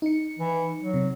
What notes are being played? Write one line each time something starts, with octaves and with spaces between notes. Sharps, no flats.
D#4 C#7
E3
F#3
C3